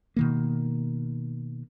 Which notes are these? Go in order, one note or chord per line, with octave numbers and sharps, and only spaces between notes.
B2 D#3 A#3